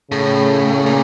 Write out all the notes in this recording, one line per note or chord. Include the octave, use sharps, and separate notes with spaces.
A2 C#3
A#2